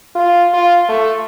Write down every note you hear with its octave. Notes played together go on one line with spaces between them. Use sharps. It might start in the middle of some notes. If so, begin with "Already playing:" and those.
F4
F4
A3